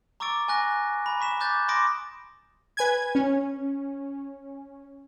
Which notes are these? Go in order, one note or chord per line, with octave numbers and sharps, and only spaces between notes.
A#5 C#6 D6 E6 A6 D7
G#5 C#6 F#6 A#6
G#5 A#5 B5
C#6 B6 E7
D6 F#6 G6 A6
B5 C6 D6 D#6 A#6 D7
B4 G#5 G#6
C#4